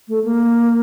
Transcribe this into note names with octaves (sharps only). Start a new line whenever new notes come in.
A3
A#3